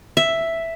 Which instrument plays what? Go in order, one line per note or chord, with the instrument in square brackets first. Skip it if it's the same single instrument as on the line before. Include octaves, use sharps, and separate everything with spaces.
[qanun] E5